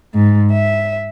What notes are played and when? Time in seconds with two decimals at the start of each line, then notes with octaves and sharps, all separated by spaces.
0.14 G#2
0.52 E5